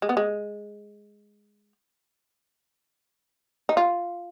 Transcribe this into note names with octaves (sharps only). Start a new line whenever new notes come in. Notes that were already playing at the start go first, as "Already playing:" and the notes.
G#3
B3
G#3
D#4
F4